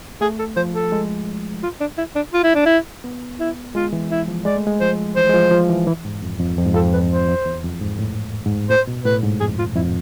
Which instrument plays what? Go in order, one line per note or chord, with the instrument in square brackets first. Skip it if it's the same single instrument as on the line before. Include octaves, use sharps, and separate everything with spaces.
[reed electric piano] A3 [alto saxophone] G#4
[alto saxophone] A4
[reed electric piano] F3 [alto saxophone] C5
[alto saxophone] A4
[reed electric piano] G#3
[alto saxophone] F4
D4
E4
D4
F4
E4
D4
E4
[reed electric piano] B3
[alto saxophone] E4
[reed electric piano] G#3 [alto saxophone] F4
[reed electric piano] E3
[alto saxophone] E4
[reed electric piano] F3
[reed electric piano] G#3 [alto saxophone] D5
[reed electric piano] A3
G#3
[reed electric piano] F3 [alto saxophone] C5
[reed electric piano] E3 [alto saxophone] C5
[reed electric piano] G#3
F3
F3
E3
E3
G#2
F2
F2
F2
G#2
[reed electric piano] F2 [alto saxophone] A4
[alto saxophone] B4
C5
[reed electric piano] F2
E2
F2
G#2
A2
G#2
[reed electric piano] A2 [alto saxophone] C5
[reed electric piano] B2
[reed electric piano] A2 [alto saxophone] B4
[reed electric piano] G#2
[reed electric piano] F2 [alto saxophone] G#4
[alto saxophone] F4
[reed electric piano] F2 [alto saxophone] E4